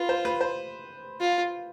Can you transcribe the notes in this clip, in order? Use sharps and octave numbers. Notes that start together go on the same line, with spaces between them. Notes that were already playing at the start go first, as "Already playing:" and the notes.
Already playing: F4 B4
C5
B4
C5
F4